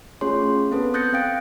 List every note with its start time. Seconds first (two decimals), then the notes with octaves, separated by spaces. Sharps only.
0.21 A3 C#4 F4 G#4 C#5 C6
0.71 B3 C4 A4 B4
0.94 D#6 F#6 G6 A6 A#6 C#7
1.13 C4 F5 G5 D7